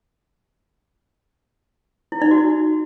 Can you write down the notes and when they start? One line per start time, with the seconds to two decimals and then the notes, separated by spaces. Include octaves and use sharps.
2.12 E4
2.22 D#4
2.31 F#4